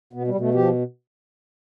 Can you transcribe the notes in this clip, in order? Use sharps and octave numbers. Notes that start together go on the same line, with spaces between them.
B2 B3
G3
B2
A3
F3 G4